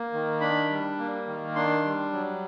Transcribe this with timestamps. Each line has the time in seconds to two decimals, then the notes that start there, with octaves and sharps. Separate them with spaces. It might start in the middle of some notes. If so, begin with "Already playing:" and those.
Already playing: A#3
0.13 D#3
0.41 D4 B5
0.70 G3
0.99 A#3
1.27 D#3
1.55 D4 C6
1.84 G3
2.13 F#3